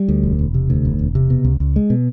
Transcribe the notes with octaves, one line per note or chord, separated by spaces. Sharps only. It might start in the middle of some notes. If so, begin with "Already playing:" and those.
Already playing: G3
D2
E1
E1
C3
D2
E1
E1
C3
B2
C#2
C#2
G#3
B2